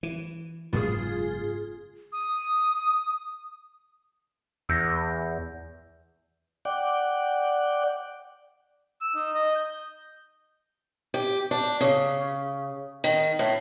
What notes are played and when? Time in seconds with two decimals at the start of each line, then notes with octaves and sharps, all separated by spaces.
0.03 E3
0.73 F#1 G#2 B3 F4 G#4
2.13 D#6
4.69 E2 E6 G6 A#6
6.65 D5 F#5 G5
9.01 E6
9.15 D#4
9.35 D#5
9.56 G6
11.14 G4
11.51 D4
11.81 C#3
13.04 D#3
13.39 A2